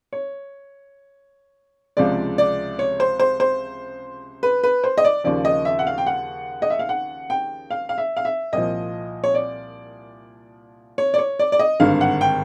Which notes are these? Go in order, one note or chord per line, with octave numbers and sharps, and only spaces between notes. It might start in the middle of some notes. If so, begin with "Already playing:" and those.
C#5
C#2 C3 F3 G#3 D5
D5
C#5
C5
C5
C5
B4
B4
C5
D#5
D5
D#2 C#3 F3 D5
D#5
E5
F#5
F5
G5
F#5
D#5
E5
F5
F#5
G5
F5
F5
E5
F5
E5
C2 A#2 F3 D#5
C#5
D5
C#5
D5
C#5
D5
D5
D#5
G#1 G2 D3 F5
F#5
G5